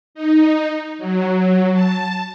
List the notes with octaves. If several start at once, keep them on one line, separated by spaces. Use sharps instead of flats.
D#4
F#3
A5